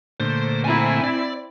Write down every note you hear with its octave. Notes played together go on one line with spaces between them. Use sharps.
A#2 D3 A3 C5
C4 E4 G#5 A#5
D5